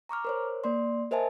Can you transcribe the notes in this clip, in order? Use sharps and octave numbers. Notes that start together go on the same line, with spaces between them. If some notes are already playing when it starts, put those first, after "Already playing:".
A#5 C#6 D6 F6
A#4 C5 C#5
A#3 D5 C6
A#4 C5 D#5 E5 G#5 A5